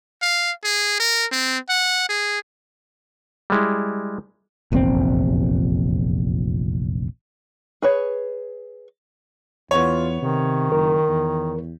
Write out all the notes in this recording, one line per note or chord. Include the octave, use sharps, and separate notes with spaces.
F5
G#4
A#4
C4
F#5
G#4
G3 G#3 E4
F1 A#1 E2 C4
G#4 B4 C#5
E2 B3 F4 C#5
C3 D#3
F#1 A#4
E2